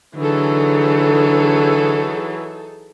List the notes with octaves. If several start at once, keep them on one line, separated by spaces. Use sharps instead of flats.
D3 E3 F#3 D#4 G#4 A4